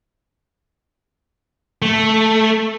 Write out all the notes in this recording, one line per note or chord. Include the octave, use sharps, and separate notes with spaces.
A3